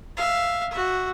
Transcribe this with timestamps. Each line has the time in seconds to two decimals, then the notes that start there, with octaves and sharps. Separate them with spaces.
0.17 E5 F5
0.72 F#4 E5